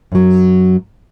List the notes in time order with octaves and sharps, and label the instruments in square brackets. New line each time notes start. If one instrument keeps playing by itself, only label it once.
[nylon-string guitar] F#2 F#3